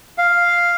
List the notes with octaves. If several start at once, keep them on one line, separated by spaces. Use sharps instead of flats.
F5